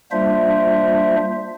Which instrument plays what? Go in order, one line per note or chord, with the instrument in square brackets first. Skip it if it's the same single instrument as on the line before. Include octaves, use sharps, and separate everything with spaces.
[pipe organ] G3 A#3 D4 F4 C5 E5